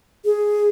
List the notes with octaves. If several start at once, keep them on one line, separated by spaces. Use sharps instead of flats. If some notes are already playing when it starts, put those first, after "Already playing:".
G#4